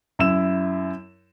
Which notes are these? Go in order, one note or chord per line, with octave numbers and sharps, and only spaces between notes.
F#2 E4 E6 E7